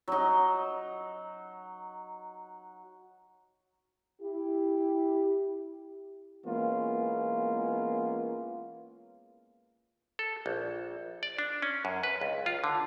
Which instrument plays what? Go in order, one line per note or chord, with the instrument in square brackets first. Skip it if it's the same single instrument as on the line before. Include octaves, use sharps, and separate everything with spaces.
[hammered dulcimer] F#3 D#4
[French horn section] E4 G4
[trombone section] E3 G#3 A#3 B3 C#4 F4
[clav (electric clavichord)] A4
A#1
D5
D4
C#4
F#2
B4
C#2
F4
D3